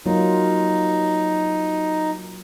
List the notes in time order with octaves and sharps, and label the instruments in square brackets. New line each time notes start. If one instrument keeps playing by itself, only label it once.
[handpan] F#3 A#3 F4 [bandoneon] D#4